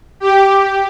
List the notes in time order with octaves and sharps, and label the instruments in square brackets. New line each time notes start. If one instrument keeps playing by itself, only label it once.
[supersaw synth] G4